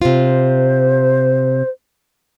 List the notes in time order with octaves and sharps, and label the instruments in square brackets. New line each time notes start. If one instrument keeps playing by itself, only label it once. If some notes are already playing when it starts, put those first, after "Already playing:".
[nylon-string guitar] C3 F4 [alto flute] C5